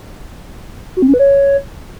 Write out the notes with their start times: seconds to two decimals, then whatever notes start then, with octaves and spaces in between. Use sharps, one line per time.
0.97 F#4
1.02 C4
1.08 C#4
1.14 B4
1.19 C#5